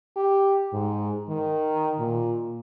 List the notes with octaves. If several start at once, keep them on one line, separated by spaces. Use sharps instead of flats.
G4
G#2
D#3
A#2